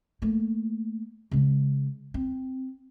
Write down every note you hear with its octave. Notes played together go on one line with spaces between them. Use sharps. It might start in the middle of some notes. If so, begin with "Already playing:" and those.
A3 A#3
C#3 G#3
C4